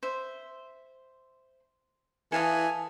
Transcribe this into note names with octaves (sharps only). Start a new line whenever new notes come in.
C5 E5
E3 A4 F5 G#5 D#6